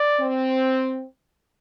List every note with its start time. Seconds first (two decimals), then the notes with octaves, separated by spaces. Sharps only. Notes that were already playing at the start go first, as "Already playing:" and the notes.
Already playing: D5
0.20 C4